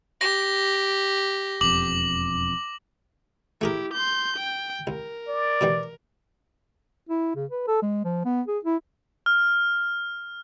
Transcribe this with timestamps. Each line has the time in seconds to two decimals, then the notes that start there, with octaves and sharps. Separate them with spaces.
0.21 G4 A#6
1.61 E1 F2 D6 F#7
3.61 A3 E4 G4 G#4 A#4
3.94 C6 G6
4.36 G5
4.87 C2 A#4
5.28 D5
5.61 B2 E3 G3
7.09 E4
7.36 C#3
7.50 B4
7.68 A4
7.82 G#3
8.05 F3
8.25 B3
8.48 G#4
8.65 E4
9.26 F6